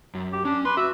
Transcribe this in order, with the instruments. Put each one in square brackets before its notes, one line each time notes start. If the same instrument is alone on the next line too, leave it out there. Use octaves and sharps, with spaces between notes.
[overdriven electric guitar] F#2
[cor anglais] G4
[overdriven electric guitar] C#4 [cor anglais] D4
[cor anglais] B4 [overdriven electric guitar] C6
[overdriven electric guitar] F#4 [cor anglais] E5